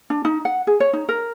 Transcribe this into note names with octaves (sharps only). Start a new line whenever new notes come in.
D4
D#4
F#5
G#4
C#5
D#4
A#4